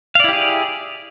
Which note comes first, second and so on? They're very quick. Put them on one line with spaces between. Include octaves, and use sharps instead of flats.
F5 D5 E4 G4 G#4